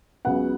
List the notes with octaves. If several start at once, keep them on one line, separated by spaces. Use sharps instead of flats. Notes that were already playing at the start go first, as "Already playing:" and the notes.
C#2 C#3 F#3 B3 F#5